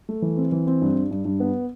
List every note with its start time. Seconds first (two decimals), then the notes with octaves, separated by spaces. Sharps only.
0.09 A3
0.22 E3
0.37 C4
0.52 E3
0.67 C4
0.82 G2
0.96 G2
1.11 G2
1.25 G2
1.40 B3